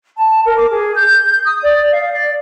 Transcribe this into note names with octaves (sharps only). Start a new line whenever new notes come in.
A5
A#4
D6
G#4
G6
D#6
D5
F5
D5